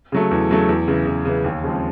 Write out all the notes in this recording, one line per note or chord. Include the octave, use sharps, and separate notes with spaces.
C#3 F#3 A3
E2
C#3 F#3 A3
E2
C#3 E3
E2
C#3 E3
D#2
C#3 F3 G#3 C4